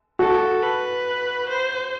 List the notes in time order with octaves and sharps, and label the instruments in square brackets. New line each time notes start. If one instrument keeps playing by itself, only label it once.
[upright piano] F#4 [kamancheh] A4
[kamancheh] B4
C5